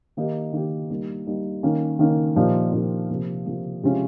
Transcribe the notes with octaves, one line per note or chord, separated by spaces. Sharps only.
D#3 A#3 D#4 G4
D#3 A#3 D#4 G4
G3 A#3 D#4
G3 A#3 D#4
D#3 A#3 C#4
D#3 A#3 C#4
A#2 F3 A#3 D#4 G4
A#2 F3 A#3 D#4 G4
C3 F3 A#3
C3 F3 A#3
C3 F3 G#3 C#4 F4